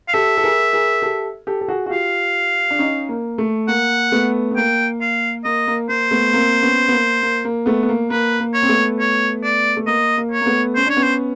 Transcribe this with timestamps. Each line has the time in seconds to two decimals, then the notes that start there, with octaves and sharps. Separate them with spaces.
0.08 F5
0.14 G4 A4 E5
0.37 A4
0.44 G#4 A#4
0.73 G#4 A#4
1.02 G4 A4
1.47 G4 A4
1.61 A4
1.68 F#4 G#4
1.86 F#4
1.90 F4 G4 F5
2.70 D4
2.79 C#4 D#4
3.09 A#3
3.38 A3
3.68 A#3 F#5
4.12 A3 B3
4.51 B3
4.57 A#3 G5
5.01 F5
5.45 A#3 D#5
5.68 A#3
5.89 A#3 C5
6.11 A3 B3
6.33 A#3 C4
6.62 B3 C#4
6.88 B3
6.92 A#3
7.23 A#3
7.45 A#3
7.66 A3 B3
7.83 B3
7.89 A#3
8.10 A#3 B4
8.40 A#3
8.54 C#5
8.62 C4
8.69 A3 B3
9.00 C#5
9.44 D5
9.77 A3
9.87 A#3 D#5
10.17 A#3
10.31 C#5
10.41 A#3
10.46 A3 B3
10.76 C#4 C5
10.86 D4 C#5
10.97 B3 C#4
11.03 C5